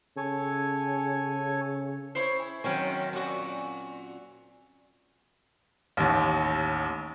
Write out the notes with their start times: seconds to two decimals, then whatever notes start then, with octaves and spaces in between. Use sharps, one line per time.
0.17 C#3 A4 C#5 G#5
2.15 E4 C5 C#5 C#6
2.40 G#4
2.64 F#2 B2 D#3 F#3 C4 C#4
3.13 A#2 F#4 A4 D5 C#6
5.97 A1 D#2